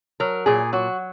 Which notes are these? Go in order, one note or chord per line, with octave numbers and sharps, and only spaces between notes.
F#3 A#4
A#2 G#4
F#3 F#4